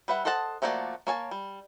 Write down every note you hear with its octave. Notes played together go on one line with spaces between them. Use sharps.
G3 B4 E5 F#5
A4 C5 D#5 F#5 A5
F3 A3 A#3 F#4 D5
A#3 C#5 G#5 A5
G3